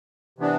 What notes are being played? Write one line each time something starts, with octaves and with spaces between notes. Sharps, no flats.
C3 E3 B3 D4